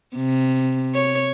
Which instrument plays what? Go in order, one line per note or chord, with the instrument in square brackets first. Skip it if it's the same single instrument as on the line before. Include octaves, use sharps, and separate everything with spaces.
[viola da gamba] C3
C#5